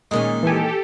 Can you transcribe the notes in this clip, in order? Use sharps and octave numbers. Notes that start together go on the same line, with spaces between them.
A#2 D#3 G#3 C#4
E3 G4 A4 G#5